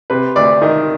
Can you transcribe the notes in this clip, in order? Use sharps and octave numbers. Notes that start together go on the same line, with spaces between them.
C3 B4
D2 D5
D#3 D#5